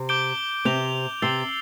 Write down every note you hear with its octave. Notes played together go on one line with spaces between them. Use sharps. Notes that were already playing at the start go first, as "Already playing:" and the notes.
Already playing: C3 C4
D6 G6 D7 G7
C3 C4 G6 D7 F7
C3 C4 E6 A6 C7 G7